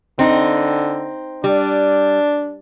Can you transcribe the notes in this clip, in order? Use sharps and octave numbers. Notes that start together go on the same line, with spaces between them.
D3 C4 D#4
G3 D4